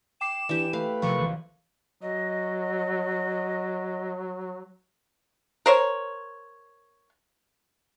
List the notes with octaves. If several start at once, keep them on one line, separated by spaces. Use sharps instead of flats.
G5 D6 C7 E7
E3 D4 G4 G5
A3 B4 F5
C3 F3 F4 A#4 C#6
A#1 D3 E3
F#3 D#5
A#4 C5 C#5